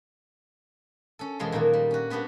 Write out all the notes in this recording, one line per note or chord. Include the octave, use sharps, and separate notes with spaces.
C#4 A4
E2 B2 F3 G#3 A4 C6
A#2 D#3 F3 F#3 A#3
G3
C#4 F#4
G3 B3 D4 F#4 G4